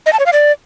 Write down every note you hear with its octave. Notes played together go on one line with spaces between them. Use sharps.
D#5
A5
C#5
F5
D5